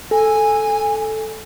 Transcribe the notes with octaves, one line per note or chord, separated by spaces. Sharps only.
A4 G#5